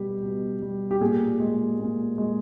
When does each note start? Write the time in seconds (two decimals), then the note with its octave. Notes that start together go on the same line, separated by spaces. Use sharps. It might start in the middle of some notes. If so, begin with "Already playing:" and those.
Already playing: B2 G3 G4
0.23 B2
0.62 G3
0.91 G4
1.01 A#2 G#4
1.40 G#3
1.80 A#2
2.18 G#3